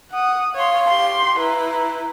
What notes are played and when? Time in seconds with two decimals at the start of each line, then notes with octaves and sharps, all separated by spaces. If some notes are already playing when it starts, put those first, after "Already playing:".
0.11 F#5 D#6
0.55 C#5 F5 C6
0.87 G4 C6
1.38 E4 B4 A#5